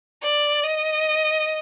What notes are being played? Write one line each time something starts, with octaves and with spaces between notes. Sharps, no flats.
D5
D#5